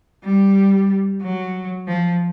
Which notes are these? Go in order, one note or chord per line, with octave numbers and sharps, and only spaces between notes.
G3
F#3
F3